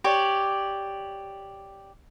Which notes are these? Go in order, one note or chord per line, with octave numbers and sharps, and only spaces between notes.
G4 C#5 D5